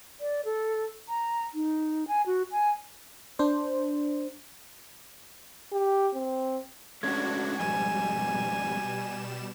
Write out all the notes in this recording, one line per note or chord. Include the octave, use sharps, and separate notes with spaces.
D5
A4
A#5
D#4
G#5
F#4
G#5
D4 C5
G4
C4
G#3 A3 C#4 D4 F#4 G#6
F2 G#2 B2 G3 G#5 E7